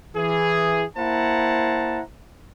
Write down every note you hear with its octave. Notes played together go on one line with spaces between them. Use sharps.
E3 G#4
A#3 E4 C5 F#5 A5 A#5